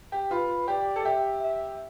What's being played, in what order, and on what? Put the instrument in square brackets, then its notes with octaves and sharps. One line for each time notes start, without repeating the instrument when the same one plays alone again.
[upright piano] G4
[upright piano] F4 [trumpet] B4
[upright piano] G4 [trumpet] D5
[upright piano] A4
[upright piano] G4 [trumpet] E5
[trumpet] E5